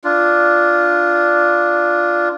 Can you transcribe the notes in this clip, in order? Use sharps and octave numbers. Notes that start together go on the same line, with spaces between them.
D4 F4